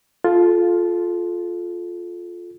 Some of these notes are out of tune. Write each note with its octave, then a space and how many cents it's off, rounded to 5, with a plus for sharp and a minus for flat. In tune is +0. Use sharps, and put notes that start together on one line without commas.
F4 +5 A4 -25